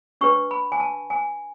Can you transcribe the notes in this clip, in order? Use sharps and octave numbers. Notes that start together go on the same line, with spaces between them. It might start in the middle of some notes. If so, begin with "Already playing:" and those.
D4 G4 B4 C#6
B5
G#5
A5
G#5